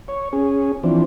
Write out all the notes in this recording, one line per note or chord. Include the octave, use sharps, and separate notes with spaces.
C#5
C#4 G#4
E3 F3 C4 D4